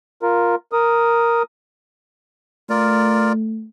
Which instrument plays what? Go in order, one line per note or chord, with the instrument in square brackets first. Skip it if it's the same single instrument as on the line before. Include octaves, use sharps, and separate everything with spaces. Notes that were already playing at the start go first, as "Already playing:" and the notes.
[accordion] F4 A#4
A#4 D#6
[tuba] A3 [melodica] F4 A#4 D5